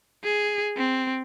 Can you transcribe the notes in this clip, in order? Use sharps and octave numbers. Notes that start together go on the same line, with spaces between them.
G#4
C4